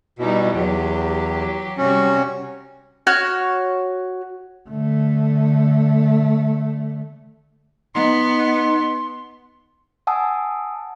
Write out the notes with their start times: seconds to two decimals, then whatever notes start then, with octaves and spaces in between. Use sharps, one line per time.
0.19 B2 G3 D#4 E4
0.52 E2 F#3 G4
1.78 C3 G3 C#4 F#4
3.07 F#4 C#5 F6
4.70 D3 A3
7.95 B3 D#4 C6
10.07 F#5 G#5 A5 D#6 E6